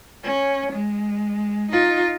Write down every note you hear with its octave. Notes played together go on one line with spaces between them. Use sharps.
C#4
G#3
D#4 F4